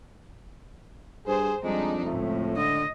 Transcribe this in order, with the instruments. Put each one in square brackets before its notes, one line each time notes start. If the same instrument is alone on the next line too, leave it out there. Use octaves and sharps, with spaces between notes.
[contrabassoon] G2 [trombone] G#4 [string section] C5
[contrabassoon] F2 [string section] G3 D4 D#4 [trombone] G#3
[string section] C#2 A2 [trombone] A3
[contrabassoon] D3 [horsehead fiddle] D#5